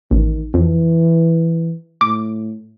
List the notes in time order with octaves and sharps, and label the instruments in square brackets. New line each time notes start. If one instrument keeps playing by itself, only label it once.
[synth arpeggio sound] A1 [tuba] D#3
[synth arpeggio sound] F2 [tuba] E3
[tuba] A2 [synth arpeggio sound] D6